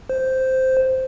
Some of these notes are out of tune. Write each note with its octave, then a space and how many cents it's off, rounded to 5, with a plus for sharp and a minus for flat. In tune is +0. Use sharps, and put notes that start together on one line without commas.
C5 -5